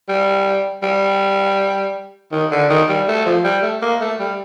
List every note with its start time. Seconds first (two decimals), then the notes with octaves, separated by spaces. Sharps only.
0.09 G3
0.83 G3
2.32 D#3
2.51 D3
2.69 D#3
2.89 G3
3.08 A3
3.26 F3
3.44 G3
3.63 A3
3.82 A#3
4.01 A3
4.20 G3